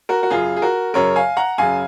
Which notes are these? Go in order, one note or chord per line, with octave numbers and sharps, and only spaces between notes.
F#4 A#4
F#4
F#2 C#3 F4 G#4
G#4
F#4 A#4
F#2 C#3 A#4 C#5
F5 G#5
F#5 A#5
F#2 C#3 F5 G#5